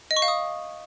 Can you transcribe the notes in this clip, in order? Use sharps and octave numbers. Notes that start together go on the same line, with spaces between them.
D#5
C#6
F5
D#6